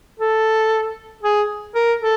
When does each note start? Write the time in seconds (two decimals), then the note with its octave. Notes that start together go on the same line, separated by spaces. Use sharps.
0.19 A4
1.23 G#4
1.75 A#4
2.01 A4